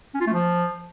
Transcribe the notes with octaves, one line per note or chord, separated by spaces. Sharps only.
C#4
F4
A3
F3